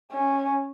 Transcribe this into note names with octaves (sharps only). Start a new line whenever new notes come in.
C#4